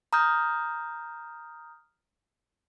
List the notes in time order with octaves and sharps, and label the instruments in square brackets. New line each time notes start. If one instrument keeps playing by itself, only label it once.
[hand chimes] A#5 D#6 F6 G6